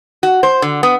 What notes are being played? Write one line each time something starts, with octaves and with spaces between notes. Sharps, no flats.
F#4
C5
D3
B3